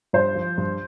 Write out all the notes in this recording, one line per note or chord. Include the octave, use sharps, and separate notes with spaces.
G2 C5
F3
G2